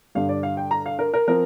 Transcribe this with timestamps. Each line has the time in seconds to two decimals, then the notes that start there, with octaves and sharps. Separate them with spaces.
0.15 G2 D3 G3 F5
0.29 D5
0.43 F5
0.57 G5
0.71 A#5
0.86 F5
0.99 A#4
1.14 A#4
1.28 F3 C4 A#4